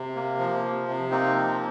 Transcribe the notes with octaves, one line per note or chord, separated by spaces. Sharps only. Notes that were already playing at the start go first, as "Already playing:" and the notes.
Already playing: C3
A#3
F3
C3
C3
A#3 C4 D#4
F3